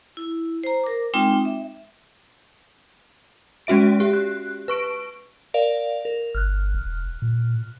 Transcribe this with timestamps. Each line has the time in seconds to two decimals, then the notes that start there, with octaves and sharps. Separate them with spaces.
0.17 E4
0.64 C5 A#5
0.84 A#4 D6
1.14 G#3 C4 D#4 F4 G5 D6
1.45 E5
3.67 G#3 C#4 F#4 E5 D7
4.00 G4
4.13 F#6
4.68 B4 C#6 D7
5.54 A#4 D5 F5
6.05 A#4
6.35 G1 F6 F#6
6.74 E1
7.22 A#2